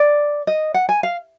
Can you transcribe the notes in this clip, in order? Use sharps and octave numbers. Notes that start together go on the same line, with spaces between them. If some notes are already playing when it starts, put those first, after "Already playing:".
Already playing: D5
D#5
F#5
G#5
F5